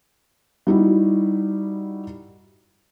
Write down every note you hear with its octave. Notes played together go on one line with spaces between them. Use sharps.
G3 D#4 E4 F#4